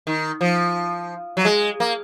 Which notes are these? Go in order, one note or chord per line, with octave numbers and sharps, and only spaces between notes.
D#3
F3
F#3
G#3
A#3